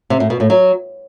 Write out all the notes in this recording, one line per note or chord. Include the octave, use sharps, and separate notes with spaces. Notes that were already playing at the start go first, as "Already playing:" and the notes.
C3
A2
B2
A2
F#3